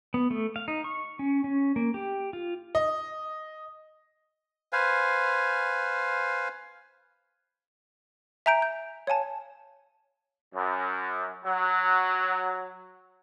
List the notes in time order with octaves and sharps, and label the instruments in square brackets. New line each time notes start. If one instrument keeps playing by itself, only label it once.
[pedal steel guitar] B3
A3
F5
D#4
C#6
C#4
C#4
A#3
G4
F4
[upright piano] D#5
[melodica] B4 C5 F5 G#5
[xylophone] E5 G#5 A#5 G6 D7
G6
C#5 F5 G#5 A5
[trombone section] F#2
F#3